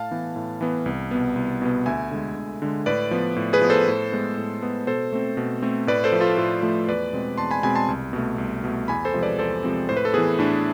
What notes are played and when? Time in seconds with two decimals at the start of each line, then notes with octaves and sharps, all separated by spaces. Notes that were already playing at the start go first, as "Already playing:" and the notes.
Already playing: A2 F5 A5
0.11 E3 B3
0.36 A2
0.61 E3 B3
0.86 C2
1.11 B2 B3
1.36 C2
1.62 B2 B3
1.86 D2 E5 G#5
2.11 D3 G#3
2.36 D2
2.62 D3 G#3
2.86 A2 B4 D5
3.11 F3 B3
3.36 A2
3.53 G#4 B4
3.61 F3 B3
3.70 A4 C5
3.87 A2
4.12 G#3 B3
4.37 A2
4.62 G#3 B3
4.87 B2 A4 C5
5.12 A3 C4
5.37 B2
5.62 A3 C4
5.87 A2 B4 D5
6.04 A4 C5
6.12 F3 A3
6.21 F4 A4
6.37 A2 F4 A4
6.62 F3 A3
6.88 E2 B4 D5
7.13 B2 G#3 C4
7.38 E2 A5 C6
7.51 G#5 B5
7.63 B2 G#3 C4 G#5 B5
7.76 A5 C6
7.88 C2
8.13 B2 A3
8.38 C2
8.64 B2 A3
8.88 E2 G#5 B5
9.05 A4 C5
9.14 C3 F3 G#3 C4
9.22 B4 D5
9.39 E2 A4 C5
9.64 C3 F3 G#3 C4
9.89 A2 C5
9.97 B4
10.05 A4
10.13 E3 B3 G#4 B4
10.39 A2 D4